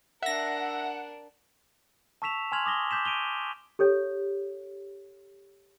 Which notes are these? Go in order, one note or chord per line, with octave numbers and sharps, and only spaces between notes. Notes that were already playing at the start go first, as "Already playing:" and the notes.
D4 A#4 E5 F#5 A#6
A5 C#6 E6 B6 E7 F7
G#5 C6 F6 G#6 F7 F#7
D6 D#6 A#6 G7
D6 G6 B6 E7
D7 D#7 F7 G7
G4 A4 C#5